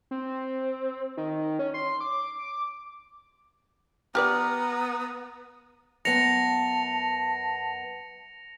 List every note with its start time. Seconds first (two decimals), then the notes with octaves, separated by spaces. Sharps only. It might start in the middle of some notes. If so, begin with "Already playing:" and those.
0.11 C4
1.17 D#3
1.59 C#4
1.74 C6
2.01 D6
4.15 B3 G4 B4 D5 A#5 F6
6.05 F#2 B3 A5 A#6 C#7 F7